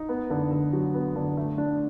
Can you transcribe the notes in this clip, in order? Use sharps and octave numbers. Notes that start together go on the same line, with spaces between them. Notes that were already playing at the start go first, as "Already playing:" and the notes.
Already playing: D#4
B3
D3
D3
F#3
B3
D3
A3
D4